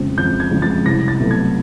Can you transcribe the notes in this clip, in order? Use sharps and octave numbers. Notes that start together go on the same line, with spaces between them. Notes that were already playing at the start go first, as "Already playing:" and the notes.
Already playing: F2 C#3 F3 G#3 C4
F2 G6
G#6
C#3 F3 G#3 C4
A6
C2 A#6
A6
B2 F#3 A3 C4
G#6